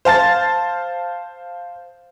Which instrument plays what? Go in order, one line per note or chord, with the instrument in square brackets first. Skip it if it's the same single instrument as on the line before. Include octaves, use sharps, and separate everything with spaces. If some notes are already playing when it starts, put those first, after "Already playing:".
[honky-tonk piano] C5 F5 A5 A6